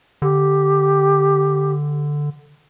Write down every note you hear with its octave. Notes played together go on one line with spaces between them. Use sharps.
D3 G4